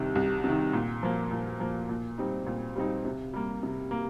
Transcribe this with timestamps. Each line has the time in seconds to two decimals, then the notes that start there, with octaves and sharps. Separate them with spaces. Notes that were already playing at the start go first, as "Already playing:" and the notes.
Already playing: C2 C3 D#3
0.15 C2
0.44 C3 D#3
0.73 A#2
1.03 F3 A#3
1.31 A#2
1.60 F3 A#3
1.89 A#2
2.18 G3 C4 D#4
2.46 A#2
2.76 G3 C4 D#4
3.05 C3
3.33 G3 A#3
3.63 C3
3.91 A#3